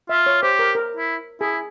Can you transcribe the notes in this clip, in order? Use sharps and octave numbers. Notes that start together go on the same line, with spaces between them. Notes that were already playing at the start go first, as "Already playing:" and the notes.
F4 E5
C#5
G4 C5
A#4
A#4
E4
E4 G#4